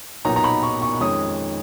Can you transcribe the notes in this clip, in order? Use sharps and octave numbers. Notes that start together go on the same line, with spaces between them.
B1 A#2 F#3 B3 D#4 A#5
A#5
B5
C#6
C#6
F2 D#3 G#3 C#4 D#6